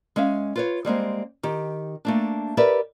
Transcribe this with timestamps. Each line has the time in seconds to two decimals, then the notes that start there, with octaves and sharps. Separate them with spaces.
0.16 G#3 C#4 E5 F5
0.56 F4 B4 C#5
0.85 G3 G#3 A#3 C4
1.43 D#3 G4
2.05 A3 A#3 D4
2.57 G4 A#4 B4 D5 E5